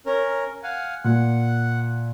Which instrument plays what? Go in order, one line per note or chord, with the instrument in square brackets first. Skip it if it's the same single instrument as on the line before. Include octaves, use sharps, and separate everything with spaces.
[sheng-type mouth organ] C#4 A#4
F5 F#5 G#5
[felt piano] A#2 [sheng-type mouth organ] F#5